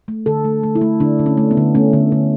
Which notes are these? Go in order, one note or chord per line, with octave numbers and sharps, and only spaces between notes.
A3
D3 A4
A3
A3
E4
A3
D3 D4
D3
C#4
A3
B3
D3
A3 C#4
D3
D3